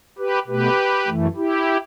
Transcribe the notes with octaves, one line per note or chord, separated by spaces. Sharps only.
G4 B4
B2 A3 G4 B4
F#2 E3 A3
E4 G4